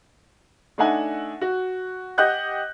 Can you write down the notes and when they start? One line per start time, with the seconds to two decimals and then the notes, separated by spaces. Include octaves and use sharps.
0.78 A3 D4 D#4 E5 F#5 G#5
1.41 F#4
2.18 G4 D#5 F#5 F#6 G6